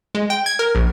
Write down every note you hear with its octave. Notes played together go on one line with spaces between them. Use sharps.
G#3
G5
G#6
A#4
A#1